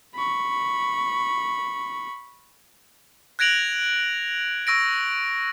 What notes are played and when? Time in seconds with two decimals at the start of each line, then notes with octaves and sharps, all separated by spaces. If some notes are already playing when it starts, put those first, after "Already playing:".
0.15 B5 C#6
3.39 F#6 G#6 A#6 D7 F7 F#7
4.67 C#6 E6 A#6 D7